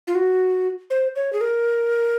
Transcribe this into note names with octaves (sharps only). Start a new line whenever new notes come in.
F4
F#4
C5
C#5
G#4
A#4